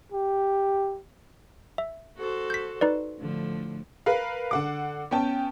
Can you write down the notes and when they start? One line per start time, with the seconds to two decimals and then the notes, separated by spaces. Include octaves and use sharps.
0.12 G4
1.78 E5
2.17 F#4 A4 C5
2.50 G6 B6
2.81 D#4 B4 D5
3.19 A2 D3 F3
4.06 A#4 B4 F5
4.51 D3 F#5 D6
5.11 B3 C#4 G5 A5